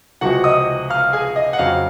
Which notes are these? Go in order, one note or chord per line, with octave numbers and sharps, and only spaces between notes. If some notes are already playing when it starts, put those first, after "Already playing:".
C#2 C3 F3 G#3 F#4 F#5
D#5 D#6
F5 F6
G#4 G#5
D#5
F#5
F2 C#3 F#3 F5